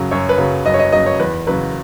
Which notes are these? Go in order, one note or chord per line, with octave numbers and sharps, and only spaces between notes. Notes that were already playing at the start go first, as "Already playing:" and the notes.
Already playing: F#2 C#3 F#3
F#2 C#5
B4
C#3 F#3
F#2 D#5
C#5
D#5
C#3 F#3 D#5
C#5
E2 B4
C#3 F#3 B4